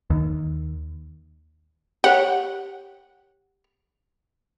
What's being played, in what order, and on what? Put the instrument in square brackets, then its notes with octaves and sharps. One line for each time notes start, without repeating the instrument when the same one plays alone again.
[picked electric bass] D#2
[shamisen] G4 C#5 [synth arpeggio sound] F#5